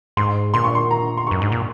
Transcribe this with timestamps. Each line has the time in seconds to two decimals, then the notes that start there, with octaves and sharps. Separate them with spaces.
0.17 G#2 C6
0.54 A#2 C6
0.64 C#6
0.75 C6
0.91 A#5
1.17 C6
1.27 F#2 C#6
1.42 G#2
1.52 A#2